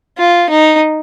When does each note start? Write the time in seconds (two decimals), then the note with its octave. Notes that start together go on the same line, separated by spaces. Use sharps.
0.18 F4
0.50 D#4